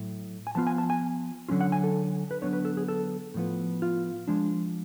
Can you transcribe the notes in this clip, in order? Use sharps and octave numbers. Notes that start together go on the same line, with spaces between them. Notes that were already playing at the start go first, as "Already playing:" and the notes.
Already playing: A2 F#3 A3
G#5
F3 B3 F4 A5
G#5
A5
G#5
D3 F#3 C#4 F4
F#5
G#5
A4
B4
D3 F#3 B3 D4 C#5
B4
A4
G#4
A4
A2 F3 B3
F4
F3 G#3 D4